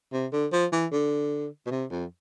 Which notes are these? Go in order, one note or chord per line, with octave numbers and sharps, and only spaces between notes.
C3
D3
F3
E3
D3
B2
C3
F2